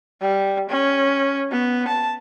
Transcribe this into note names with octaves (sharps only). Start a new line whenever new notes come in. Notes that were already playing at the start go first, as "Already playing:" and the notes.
G3
C#4
B3
A5